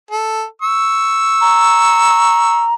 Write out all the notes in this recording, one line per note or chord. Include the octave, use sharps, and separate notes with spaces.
A4
C#6 E6
A#5